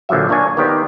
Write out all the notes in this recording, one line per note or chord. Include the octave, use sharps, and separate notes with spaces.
A#1 D3 F3 F#3 E5
A#3 D4 C#5 G#5
D#3 B3 D#4 G4 C5 D5